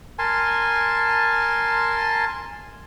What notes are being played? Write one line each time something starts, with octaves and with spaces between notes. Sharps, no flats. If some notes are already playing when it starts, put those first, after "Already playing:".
A#4 G#5 A5 C6